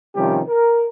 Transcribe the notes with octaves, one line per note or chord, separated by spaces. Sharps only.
C3 D#3 F3 G3 C#4 G4
A#4